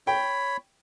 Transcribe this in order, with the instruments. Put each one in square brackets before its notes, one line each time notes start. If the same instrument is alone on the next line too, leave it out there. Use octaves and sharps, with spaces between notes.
[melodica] C#5 B5 [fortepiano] G5